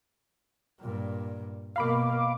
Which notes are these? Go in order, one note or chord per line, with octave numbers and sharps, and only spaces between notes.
G2 A#2
B2 A#3 F5 B5 D6